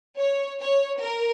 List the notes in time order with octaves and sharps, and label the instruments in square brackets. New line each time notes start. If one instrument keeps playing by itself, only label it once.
[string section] C#5
C#5
A#4